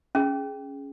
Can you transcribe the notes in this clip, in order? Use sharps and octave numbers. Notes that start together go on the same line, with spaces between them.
C#4 G#4